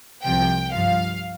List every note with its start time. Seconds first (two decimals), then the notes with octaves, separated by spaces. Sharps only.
0.23 C2 C3 F3 G5
0.73 G2 F3 F5